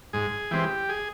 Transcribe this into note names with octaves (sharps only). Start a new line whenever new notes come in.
G#2 G#4
E3 G#3 C4 G4
G#4